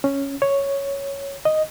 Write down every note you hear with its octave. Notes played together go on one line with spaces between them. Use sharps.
C#4
C#5
D#5